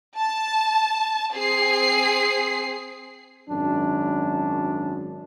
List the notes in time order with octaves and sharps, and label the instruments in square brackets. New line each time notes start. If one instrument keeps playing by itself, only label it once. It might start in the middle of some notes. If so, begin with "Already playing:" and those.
[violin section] A5
C4 G#4 C7
[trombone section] G#1 F#2 D4